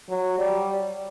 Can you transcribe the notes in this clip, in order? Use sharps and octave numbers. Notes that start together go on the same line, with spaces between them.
F#3
G3